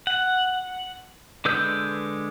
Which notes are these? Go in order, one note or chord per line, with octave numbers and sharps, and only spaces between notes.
F#5
D3 G#3 B4 E6 G6